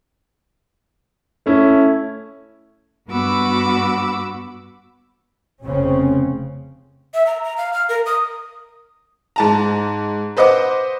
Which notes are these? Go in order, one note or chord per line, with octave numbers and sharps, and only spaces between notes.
A3 C#4 E4
G2 B3 F#4 B5 D6 E6
F1 C#3 C4 C#4
E5
A#5
A#5
F5
F6
A#4
D#6
G#2 A5 A#5
B4 C5 D#5 F#5 D6